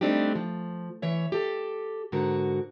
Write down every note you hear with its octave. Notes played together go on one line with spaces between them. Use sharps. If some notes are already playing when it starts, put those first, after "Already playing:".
G3 A3 C4 D4 D#4 G4
F3
E3 C#5 E5
G4 A4
G#2 D3 F#4 A#4